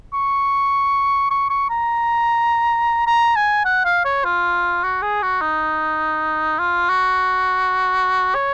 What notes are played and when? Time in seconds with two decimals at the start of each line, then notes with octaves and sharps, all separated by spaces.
0.14 C#6
1.31 C#6
1.50 C#6
1.70 A#5
3.07 A#5
3.36 G#5
3.65 F#5
3.85 F5
4.05 C#5
4.24 F4
4.84 F#4
5.02 G#4
5.22 F#4
5.41 D#4
6.59 F4
6.89 F#4
8.35 C#5